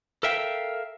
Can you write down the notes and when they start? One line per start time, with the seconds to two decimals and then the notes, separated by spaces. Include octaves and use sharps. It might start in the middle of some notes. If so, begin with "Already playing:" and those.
0.23 A4 A#4 E5 F5 G5